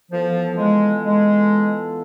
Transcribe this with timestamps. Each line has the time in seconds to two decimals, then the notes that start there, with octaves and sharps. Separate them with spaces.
0.11 E3 F3 B3 F4 A4
0.58 G#3
1.05 G#3